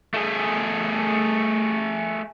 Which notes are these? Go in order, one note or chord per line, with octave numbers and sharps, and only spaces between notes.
A3 G#4